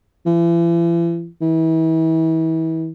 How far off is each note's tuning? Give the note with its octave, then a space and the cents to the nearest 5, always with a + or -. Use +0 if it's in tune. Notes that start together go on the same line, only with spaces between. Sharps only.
E3 +45
E3 -35